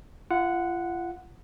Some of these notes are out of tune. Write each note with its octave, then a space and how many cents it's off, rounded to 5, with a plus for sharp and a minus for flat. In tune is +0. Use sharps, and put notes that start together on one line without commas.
F4 -35 F#5 -5